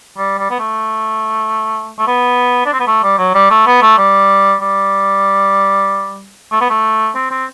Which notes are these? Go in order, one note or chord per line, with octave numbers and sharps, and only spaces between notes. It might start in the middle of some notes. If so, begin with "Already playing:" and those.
G3
G3
B3
A3
A3
B3
D4
C4
B3
A3
G3
F#3
G3
A3
B3
A3
G3
G3
A3
B3
A3
C4
C4